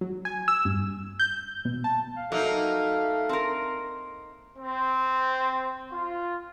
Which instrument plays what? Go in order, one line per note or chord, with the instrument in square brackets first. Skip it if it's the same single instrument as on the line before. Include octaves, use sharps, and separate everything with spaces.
[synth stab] F#3
G#5
E6
G2
G6
B2
A5
[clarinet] F5
[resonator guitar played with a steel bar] F#3 [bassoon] A3 [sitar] A#3 D#4
[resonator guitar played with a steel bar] C4 A#4
[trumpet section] C4
F4